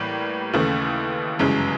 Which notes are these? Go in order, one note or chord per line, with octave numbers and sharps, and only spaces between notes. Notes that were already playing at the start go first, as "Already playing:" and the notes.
Already playing: A2 E3 G3 A#3
D#2 C#3 E3 A3
G1 F#2 C#3 E3 G#3